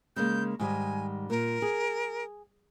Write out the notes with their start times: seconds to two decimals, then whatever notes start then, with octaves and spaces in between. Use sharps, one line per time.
0.16 C#3 G#3 A#3 G6
0.60 G#2 D#3 G3 G#5
1.30 A#2 A#4
1.62 G#4